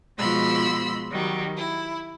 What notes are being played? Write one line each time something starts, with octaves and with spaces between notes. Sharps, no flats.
B2 F3 G#3 B5 C6 E6
D#3 F#3 G3
E4